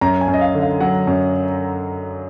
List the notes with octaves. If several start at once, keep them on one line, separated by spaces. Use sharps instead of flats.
F#2 A#5
G#5
F#2
D#5
F5
D3
F5
F#3 F#5
F#2